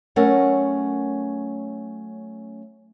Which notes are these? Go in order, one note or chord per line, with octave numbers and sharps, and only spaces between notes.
F#3 A3 C#4 A#4 F#5